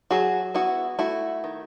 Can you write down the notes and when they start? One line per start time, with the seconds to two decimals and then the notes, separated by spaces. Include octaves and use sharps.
0.11 F#3 F#4 G#4
0.54 B3 E4 F#4
0.99 A3 E4 F#4
1.44 D#3